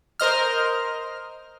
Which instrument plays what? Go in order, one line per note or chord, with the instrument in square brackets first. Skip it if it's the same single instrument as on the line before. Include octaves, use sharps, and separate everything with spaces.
[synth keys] A#4 C5 D#5 F6